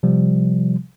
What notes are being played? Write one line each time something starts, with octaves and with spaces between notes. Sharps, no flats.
C3 F3 G3